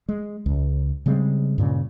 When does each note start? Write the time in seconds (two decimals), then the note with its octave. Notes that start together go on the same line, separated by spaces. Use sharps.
0.09 G#3
0.46 C#2
1.06 C#3 G3 G#3 C4
1.58 G2 A#2 C#3